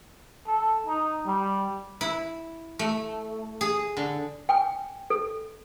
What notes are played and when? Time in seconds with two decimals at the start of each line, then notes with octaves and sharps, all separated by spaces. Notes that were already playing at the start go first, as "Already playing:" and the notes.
0.47 A4
0.86 D#4
1.26 G3
2.01 E4
2.79 A3
3.61 G#4
3.97 D3
4.49 G5 G#5
5.10 A4